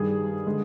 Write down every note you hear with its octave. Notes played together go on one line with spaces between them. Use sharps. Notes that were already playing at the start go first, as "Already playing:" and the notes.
Already playing: G2 D#3 G3 G#4
D3 G#3